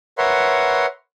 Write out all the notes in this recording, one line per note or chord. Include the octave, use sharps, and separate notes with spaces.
A#4 B4 C#5 E5 F#5 C6